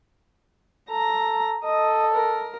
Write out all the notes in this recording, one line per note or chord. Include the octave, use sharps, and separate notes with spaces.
A4 A#5
A4 D#5
A#4